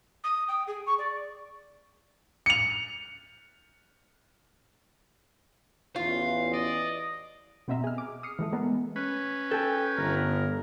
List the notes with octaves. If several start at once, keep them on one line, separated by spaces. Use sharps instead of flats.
D#6
G5
G#4
C#6
D5
C#7 F7
A1 E2 F4 F5
D5 D#5
B2 B3 C4 D#5 E5 A#5
G#4 F6
D6
D#6 F6 C7 C#7
E3 G#3 A3
G#3 A3 B3 A#4
C#4 B4
A4 G5 G#5
G1 A#4